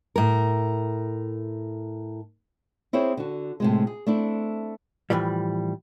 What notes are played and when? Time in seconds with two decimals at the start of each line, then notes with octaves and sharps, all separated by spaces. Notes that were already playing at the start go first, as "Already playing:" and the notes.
0.16 A2 A#4
2.93 C4 E4 G#4 C5 C#5
3.17 D3 F#4
3.60 A2 C3 G#3
3.87 G#4
4.07 A3 C4 D4 E4
5.10 A2 E3 F3 G3